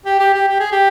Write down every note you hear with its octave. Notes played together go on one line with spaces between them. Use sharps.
G4
G4
G4
G4
G#4
G4